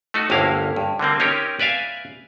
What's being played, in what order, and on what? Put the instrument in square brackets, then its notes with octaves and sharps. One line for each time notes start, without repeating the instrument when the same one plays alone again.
[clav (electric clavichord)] A3 D#4 F#4
G1 D2 G2 A#3 E4 F5
G2
D3 G3 A#3 C4
C4 C#4 D#4 G4 A#4 C#5
B4 D5 E5 F5 G#5